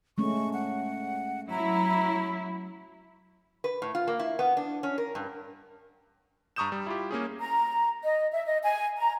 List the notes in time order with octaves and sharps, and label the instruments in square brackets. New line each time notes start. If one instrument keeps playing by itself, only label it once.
[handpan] G#3 A3 C#4 [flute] C#6
[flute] F#5
[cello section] F#3 E4 [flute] A#5
[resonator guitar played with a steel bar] B4
A2
F4
A#3
E4
B3
D4
C#4
A#4
G2
[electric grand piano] G2 A#5 C#6 D#6 G6 E7
G3
E4 F4 G4
A#3 C#4 G#4
[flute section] A#5
D#5
E5
D#5
G#5
A#5